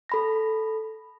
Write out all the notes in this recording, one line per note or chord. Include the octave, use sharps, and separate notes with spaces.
A4 B5 A#6